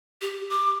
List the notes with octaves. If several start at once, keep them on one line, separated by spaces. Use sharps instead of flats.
G4
D6